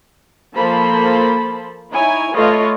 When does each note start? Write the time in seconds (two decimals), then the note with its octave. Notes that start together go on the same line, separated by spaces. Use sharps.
0.56 F3 A#3 A4 C5 A5 B5
1.92 D#4 E4 C#5 G#5
2.34 A3 F4 B4 C#5 D#5